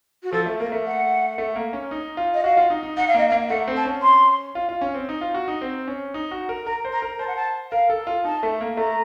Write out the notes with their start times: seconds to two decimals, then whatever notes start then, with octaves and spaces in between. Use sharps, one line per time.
0.23 F#4
0.32 F3 A4
0.46 A3
0.60 A#3 A#4
0.72 A3
0.86 F#5
1.38 A3
1.56 A#3
1.73 C#4
1.91 D#4
2.17 F4
2.34 D#5
2.44 F#4 F5
2.57 F4
2.70 D#4
2.83 D#4
2.97 D#4 F#5
3.08 F5
3.14 A#3 D#5
3.29 F5
3.32 A#3
3.49 A3 F#5
3.68 C4
3.77 A5
3.85 C#4
4.02 C6
4.55 F4
4.69 F4
4.81 C#4
4.95 C4
5.09 D#4
5.21 F4
5.34 F#4
5.48 D#4
5.62 C4
5.88 C#4
6.14 D#4
6.31 F#4
6.49 A#4
6.66 A#4 A#5
6.85 C5
6.93 A#5
7.02 A#4
7.19 C5 A5
7.28 F#5
7.37 A5
7.72 A#4 F5
7.90 A4
8.07 F4
8.24 D#4 A5
8.43 A3
8.61 A#3
8.77 A3 A#5